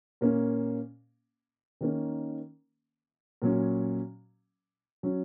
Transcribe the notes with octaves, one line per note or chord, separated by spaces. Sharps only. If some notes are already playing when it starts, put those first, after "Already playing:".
A#2 A#3 C#4
D#3 A#3 C#4
A#2 F#3 C#4
F#3 C#4